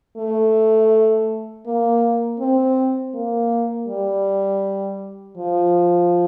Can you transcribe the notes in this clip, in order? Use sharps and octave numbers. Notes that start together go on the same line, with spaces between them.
A3
A#3
C4
A#3
G3
F3